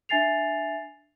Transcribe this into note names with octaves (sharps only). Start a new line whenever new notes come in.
D4 E5 G#5 A6 C7 F7